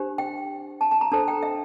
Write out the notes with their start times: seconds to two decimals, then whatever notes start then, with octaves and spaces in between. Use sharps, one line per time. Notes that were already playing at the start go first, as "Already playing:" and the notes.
Already playing: D4 G4 C5
0.18 G5
0.81 A5
0.91 A5
1.01 A#5
1.12 D4 A4 C5 A5
1.28 G5
1.43 E5